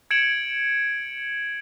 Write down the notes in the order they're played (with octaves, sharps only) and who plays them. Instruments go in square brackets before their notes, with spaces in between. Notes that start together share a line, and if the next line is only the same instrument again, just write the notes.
[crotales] G#6 C#7 D7 E7 F#7